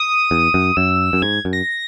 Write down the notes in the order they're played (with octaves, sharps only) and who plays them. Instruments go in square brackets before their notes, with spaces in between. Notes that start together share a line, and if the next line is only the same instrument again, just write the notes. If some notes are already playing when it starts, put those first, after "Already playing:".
Already playing: [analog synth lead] D#6
[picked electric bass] E2
F#2
[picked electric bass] F#2 [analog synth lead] E6
[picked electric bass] F#2
[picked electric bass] G#2 [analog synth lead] G#6
[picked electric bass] F#2
[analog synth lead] A#6